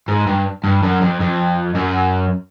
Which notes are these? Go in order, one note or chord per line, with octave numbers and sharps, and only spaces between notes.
G#2
G2
G2
F#2
F2
F2
F#2